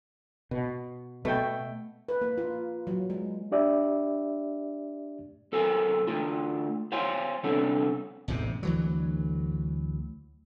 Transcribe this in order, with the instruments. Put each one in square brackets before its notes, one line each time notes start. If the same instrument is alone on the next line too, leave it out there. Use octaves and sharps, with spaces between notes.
[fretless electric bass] B2
[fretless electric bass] B2 [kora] A3 G5
[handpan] B4
A#3
F4
F#3
G#3
[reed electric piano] D4 G4 D5 E5
[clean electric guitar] B1 A4 A#4 C5 G#5
D3 A3 F4
C5 C#5 F5 G#5 C6
C3 G3 B3 C#4 D4 A4
[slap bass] A1 E2 G#2 C3
D2 E3 F#3